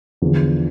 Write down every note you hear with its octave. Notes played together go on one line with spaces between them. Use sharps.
E2 D3 F3